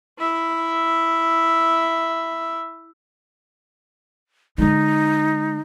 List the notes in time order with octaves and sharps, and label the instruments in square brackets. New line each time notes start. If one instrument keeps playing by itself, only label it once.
[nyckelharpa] E4 E5
[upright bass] D3 G#3 [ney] D#4